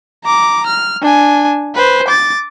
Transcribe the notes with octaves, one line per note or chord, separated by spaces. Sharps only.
A#5 D6
F6
D4 G#5
B4 C5
D6 A6